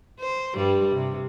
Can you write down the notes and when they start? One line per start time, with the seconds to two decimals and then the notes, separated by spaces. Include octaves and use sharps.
0.20 C5
0.54 G2 G3
0.95 C3